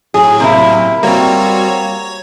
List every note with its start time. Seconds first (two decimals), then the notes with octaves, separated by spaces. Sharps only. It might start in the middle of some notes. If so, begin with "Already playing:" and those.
0.14 A2 F#3 G#4
0.40 C3 A#3 E4
1.03 G3 A#3 C4 F#4 C#5
1.68 C#5